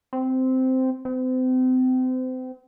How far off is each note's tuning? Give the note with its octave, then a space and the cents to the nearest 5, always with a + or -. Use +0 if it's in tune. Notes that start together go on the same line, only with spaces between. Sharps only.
C4 -10
C4 -35